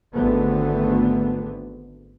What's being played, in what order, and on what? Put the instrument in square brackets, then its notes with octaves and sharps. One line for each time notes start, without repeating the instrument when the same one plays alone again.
[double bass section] G#1 D3 A3 B3